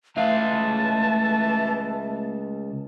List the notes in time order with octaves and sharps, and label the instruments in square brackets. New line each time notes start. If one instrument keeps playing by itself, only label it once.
[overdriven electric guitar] C#2 F5 [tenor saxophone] E3 [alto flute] A3 [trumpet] A5